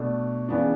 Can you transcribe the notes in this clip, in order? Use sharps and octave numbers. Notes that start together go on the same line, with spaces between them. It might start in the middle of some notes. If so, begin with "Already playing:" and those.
Already playing: B2 A3 D4
C#3 E3 B3 D4